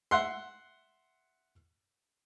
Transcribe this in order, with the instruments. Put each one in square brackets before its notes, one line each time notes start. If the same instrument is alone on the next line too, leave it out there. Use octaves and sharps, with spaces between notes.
[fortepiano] E5 F#5 C6